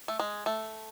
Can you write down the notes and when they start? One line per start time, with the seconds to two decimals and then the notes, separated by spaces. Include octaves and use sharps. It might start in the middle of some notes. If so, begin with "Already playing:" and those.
0.08 A3
0.20 G#3
0.46 A3